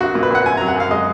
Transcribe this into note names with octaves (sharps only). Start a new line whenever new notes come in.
A#1 F#4
A#2
B4
A#2 F#5
F#2 G#5
F#3 A#5
F#5
F#2 F5
G#3 D#5